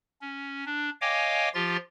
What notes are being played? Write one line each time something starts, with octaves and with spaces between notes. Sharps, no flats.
C#4
D4
C#5 D#5 F5 G5 G#5 D6
F3 F4 G4 A6